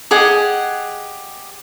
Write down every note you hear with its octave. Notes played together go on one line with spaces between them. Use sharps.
G4 G#4 D#5 F#5